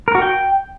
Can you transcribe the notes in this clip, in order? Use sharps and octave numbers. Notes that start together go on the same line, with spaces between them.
A#4
F#4
G5